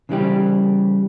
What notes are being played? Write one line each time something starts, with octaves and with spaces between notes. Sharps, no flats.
C#3 E3 G3 G4